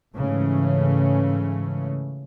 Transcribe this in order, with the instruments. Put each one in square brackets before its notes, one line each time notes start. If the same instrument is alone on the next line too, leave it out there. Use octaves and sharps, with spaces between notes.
[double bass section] G#2 C#3 E3 A3 C#4